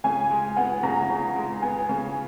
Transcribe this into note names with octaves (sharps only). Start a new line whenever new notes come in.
C#3 G#5
G#3
B3 F#5
C#3 A#5
C#3
G#3
B3 G#5
C#3